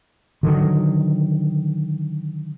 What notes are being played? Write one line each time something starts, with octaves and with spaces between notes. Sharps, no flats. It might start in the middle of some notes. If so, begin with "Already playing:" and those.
D3 D#3 F#3